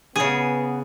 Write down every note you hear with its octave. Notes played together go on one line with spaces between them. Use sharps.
C#3 B3 G#4